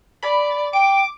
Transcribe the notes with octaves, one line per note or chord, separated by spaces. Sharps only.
D5 B5
G5 D6 D7